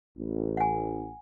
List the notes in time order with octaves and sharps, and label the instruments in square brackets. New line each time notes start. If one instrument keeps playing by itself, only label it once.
[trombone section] A1
[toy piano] F#5 G#5